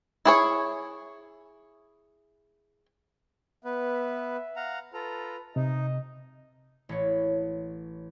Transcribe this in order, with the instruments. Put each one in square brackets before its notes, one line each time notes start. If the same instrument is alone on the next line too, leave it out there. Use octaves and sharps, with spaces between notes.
[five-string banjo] E4 G#4 C#5
[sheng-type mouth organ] B3 B4 [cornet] E5
[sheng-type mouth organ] F5 F#5 A#5
[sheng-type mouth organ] F4 A4 A#5 [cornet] B4
[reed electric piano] C3 [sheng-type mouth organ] D#4 [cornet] D#5
[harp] A1 C#5